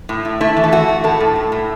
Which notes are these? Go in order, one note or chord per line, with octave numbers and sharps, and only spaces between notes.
A2
A2
A3 E4
E3
A4
A3 F#4
A3
A2 A4
A2
A2
A2